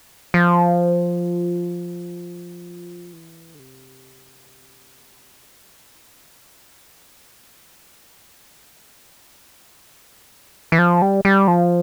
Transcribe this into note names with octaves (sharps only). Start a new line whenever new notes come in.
F3
E3
D3
C3
E3
F3
G3
E3
F3
G3
G3
F3